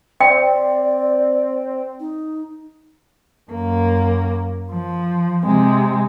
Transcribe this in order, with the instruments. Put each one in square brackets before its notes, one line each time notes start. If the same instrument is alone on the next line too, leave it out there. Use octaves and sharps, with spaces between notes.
[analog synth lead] C4 [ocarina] D5 [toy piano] G5
[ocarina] D#4
[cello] F#2 A#3
F3
C3 G#3